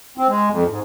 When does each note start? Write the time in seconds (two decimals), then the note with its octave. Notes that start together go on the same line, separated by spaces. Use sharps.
0.18 C4
0.29 G#3
0.50 F2
0.69 G#2